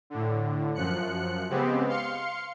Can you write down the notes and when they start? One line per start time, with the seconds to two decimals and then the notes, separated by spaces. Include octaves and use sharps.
0.10 A2 D3
0.74 F#2 F3 F#6 C#7
1.49 C#3 G#3 B3 C4 G4
1.87 F5 C6 C#7